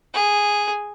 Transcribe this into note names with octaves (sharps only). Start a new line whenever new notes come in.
G#4